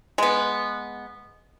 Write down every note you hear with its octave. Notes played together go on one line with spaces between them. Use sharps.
G#3 B3